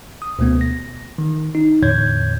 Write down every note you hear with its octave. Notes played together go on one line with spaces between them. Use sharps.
D#6
D2 B2 A3 B3
A#6
D#3
D#4
E2 A2 D3 C#5 G6 G#6